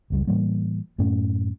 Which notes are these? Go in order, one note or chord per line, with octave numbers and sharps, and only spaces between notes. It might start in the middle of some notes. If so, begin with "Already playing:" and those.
F#1 C#2 G3
A2 E3 G3 A#3
F#2 A2 A3 C#4